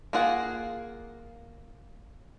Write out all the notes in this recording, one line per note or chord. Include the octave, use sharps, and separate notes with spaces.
A#3 F4 G#4 F#5